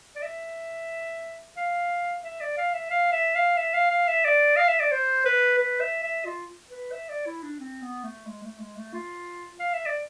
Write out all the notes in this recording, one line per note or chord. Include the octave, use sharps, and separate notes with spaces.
D5
E5
F5
E5
D5
F5
E5
F5
E5
F5
E5
F5
F5
E5
D5
F5
E5
D5
C5
B4
B4
E5
E5
F4
B4
E5
D5
E4
D4
C4
B3
A3
G#3
A3
G#3
A3
F4
F5
E5
D5